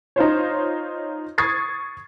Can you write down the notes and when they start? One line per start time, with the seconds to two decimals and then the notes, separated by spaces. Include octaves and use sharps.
0.16 D#4 F4 C5 C#5
1.38 C#6 D#6 G#6 A6 C7